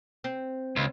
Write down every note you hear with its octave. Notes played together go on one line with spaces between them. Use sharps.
C4
C#2